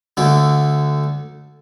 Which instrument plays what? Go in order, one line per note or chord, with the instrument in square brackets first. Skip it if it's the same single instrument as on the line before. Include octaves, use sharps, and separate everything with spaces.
[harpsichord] D2 D3